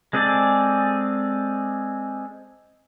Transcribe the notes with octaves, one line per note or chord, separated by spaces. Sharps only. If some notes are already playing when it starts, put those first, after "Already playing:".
G#3 C4 G#4 A4 D5